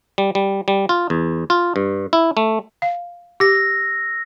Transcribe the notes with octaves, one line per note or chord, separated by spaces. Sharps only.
G3
G3
G3
F4
E2
F4
G2
E4
A3
F5
G4 E6 A#6